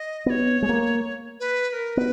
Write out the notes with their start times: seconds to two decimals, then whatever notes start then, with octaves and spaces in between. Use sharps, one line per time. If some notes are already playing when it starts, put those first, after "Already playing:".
Already playing: D#5
0.26 B3 C#5 D#5
0.62 G#3
0.69 A#3
1.40 B4
1.69 B4
1.73 A#4
1.97 B3 B4